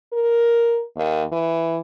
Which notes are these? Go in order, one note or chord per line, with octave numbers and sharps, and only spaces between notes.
A#4
D#2
E3